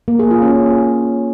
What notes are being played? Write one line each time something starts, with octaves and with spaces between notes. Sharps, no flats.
A#3
G#4
F4
C#4